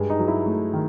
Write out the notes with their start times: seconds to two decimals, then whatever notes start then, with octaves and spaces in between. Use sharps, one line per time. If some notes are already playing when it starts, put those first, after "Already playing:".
Already playing: G2 G#3
0.10 D#4
0.19 F#3
0.28 E4
0.46 A3
0.74 D#3